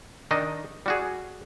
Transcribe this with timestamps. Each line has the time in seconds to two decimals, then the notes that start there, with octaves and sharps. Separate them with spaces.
0.31 D#3 D4 D#4 D#5
0.86 G3 F#4 G#4